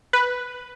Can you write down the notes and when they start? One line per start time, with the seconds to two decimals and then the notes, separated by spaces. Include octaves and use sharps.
0.13 B4